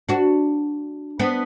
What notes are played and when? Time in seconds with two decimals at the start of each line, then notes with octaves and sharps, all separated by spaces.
0.09 D4 F#4
1.19 B3 D4